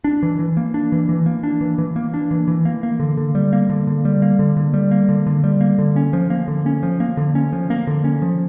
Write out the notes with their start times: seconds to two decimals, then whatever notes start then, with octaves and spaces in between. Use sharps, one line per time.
0.04 D4
0.23 E3
0.39 E3
0.57 A#3
0.74 D4
0.92 E3
1.09 E3
1.26 A#3
1.43 D4
1.61 E3
1.78 E3
1.96 A#3
2.14 D4
2.31 E3
2.48 E3
2.65 A#3
2.83 A#3
3.00 D3
3.17 D3
3.35 G3
3.53 A#3
3.70 D3
3.87 D3
4.05 G3
4.22 A#3
4.39 D3
4.57 D3
4.74 G3
4.91 A#3
5.09 D3
5.27 D3
5.44 G3
5.61 A#3
5.79 D3
5.96 C#4
6.13 F3
6.30 A#3
6.48 D3
6.66 C#4
6.83 F3
7.00 A#3
7.17 D3
7.35 C#4
7.53 F3
7.70 A#3
7.87 D3
8.04 C#4
8.22 F3